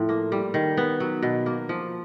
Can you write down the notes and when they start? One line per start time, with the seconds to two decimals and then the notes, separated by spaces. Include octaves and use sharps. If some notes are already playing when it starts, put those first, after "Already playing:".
Already playing: A2 F3
0.09 A#3
0.32 G3
0.54 D#3
0.77 B3
1.00 F#3
1.23 B2
1.46 A#3
1.69 F3